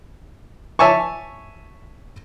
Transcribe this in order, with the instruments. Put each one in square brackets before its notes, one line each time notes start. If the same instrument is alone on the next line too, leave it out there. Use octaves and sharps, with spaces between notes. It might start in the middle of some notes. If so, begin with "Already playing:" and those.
[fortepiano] C#5 E5 G#5 A5 C#6